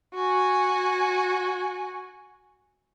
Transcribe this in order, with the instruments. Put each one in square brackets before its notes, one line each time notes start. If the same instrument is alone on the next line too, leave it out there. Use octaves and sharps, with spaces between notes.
[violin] F#4 G#5